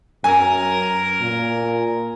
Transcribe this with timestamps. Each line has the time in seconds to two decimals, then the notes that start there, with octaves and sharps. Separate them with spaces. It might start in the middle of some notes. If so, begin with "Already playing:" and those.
0.24 F#2 A#4 G#5
1.21 A#2